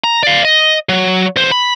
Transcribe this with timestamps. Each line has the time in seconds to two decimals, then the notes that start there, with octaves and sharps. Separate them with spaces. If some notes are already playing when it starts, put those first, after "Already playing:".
0.04 A#5
0.23 D5 F5
0.45 D#5
0.89 F#3
1.36 E2 C5
1.52 B5